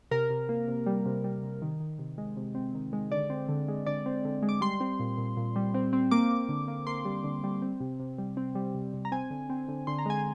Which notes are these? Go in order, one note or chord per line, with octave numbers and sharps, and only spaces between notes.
C3 A#4
C3
A#3
C3
G3
C3
G3
C3
D#3
D#3
C3
G#3
C3
C4
D#3
G#3
D3 D5
C4
D3
G#3
D3 D5
C4
D3
G#3
D6
G3 C6
C4
A#2
A#2
A#2
G3
C4
C4
A#3 D6
A#3
D3
A#3
A#3 C6
G3
D3
G3
C4
C3
C3
G3
C4
G3
C3
C3
A#5
C4 G#5
D3
C4
D3
D3 C6
A#5
G#3 G#5